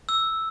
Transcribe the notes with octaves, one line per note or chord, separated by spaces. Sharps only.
E6